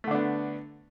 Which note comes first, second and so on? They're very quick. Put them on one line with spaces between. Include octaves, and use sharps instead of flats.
A3 D3 D4 B3